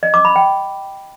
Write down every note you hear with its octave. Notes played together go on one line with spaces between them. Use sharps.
D#5
D6
B5
G5